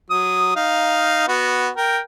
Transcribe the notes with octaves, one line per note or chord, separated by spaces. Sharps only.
F#3 D#6
D#4 F5
B3 F#4
A#4 G5